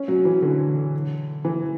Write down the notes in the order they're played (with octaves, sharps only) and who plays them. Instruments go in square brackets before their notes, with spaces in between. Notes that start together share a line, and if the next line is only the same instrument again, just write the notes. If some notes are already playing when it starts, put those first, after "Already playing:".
Already playing: [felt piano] C#4
F#3
E3
D3
E3